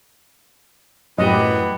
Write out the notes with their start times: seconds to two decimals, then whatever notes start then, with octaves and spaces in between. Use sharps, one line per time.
1.18 F#2 A2 E3 G3 B3 G4 D#5